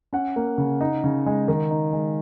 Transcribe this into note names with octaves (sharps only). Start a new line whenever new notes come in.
C#4 F#5
A#3
C#3
D#4
C#3
G#3
D#3
D#4
G#3